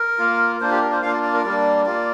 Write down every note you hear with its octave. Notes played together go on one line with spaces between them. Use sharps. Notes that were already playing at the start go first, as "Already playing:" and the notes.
Already playing: A#4
A#3 F4
A#3 D4 F4 C5
G4
A#4
C5
A#3 D4 F4 F5
D5
D5
A#4
G3 A#3 D4 D5
A#3 F4 D5